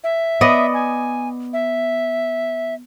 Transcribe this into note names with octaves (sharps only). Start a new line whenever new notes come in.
E5
B3 D5 D#5
G#5
E5